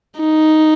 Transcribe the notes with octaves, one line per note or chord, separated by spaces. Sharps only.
D#4